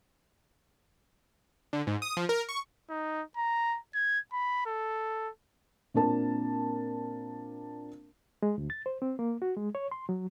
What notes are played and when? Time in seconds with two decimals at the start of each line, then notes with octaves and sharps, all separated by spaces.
1.73 D3
1.87 G#2
2.02 D#6
2.17 F3
2.29 A#4
2.49 C#6
2.90 D#4
3.37 A#5
3.95 G#6
4.33 B5
4.66 A4
5.94 A#2 C4 D4 A#4 A5
8.42 G#3
8.58 D2
8.70 A6
8.86 C5
9.02 C4
9.19 A#3
9.42 F#4
9.57 G#3
9.75 C#5
9.91 C6
10.09 F#3